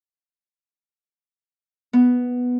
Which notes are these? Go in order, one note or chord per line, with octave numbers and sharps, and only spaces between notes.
B3